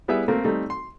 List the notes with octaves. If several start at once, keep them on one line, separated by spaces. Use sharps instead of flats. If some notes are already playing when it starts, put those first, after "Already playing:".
G3 B3 E4 G#4 E5
A3 A#3 C4
G3 A3 C4 D#4
C6